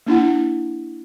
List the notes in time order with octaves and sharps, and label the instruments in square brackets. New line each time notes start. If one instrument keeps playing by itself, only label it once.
[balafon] A#3 D4 E4 F#5